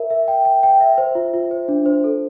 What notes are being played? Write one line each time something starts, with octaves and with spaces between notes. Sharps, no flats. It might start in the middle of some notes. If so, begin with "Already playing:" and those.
Already playing: A#4 E5
E5
G5
G5
G5
E5
C5
F4
F4
C5
D4
C5
A4